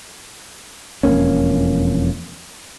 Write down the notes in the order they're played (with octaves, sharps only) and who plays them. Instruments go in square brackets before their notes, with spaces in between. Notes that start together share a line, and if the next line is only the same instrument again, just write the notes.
[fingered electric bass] E1 F2 A#3 C#4